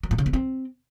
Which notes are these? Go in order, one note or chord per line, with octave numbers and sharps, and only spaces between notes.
F#3
A#2
C#3
B3
C4